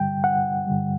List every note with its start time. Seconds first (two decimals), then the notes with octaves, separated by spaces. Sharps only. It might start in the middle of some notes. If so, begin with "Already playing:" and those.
Already playing: G2 D3 G3 G5
0.24 F#5
0.66 G2 D3 G3